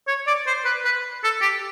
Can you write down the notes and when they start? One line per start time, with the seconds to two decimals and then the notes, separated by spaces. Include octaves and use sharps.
0.08 C#5
0.27 D5
0.47 C5
0.65 B4
0.85 B4
1.23 A4
1.42 G4